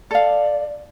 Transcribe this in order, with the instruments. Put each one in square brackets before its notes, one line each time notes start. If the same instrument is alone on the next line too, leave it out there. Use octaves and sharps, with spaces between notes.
[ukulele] A4 F5 [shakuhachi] D5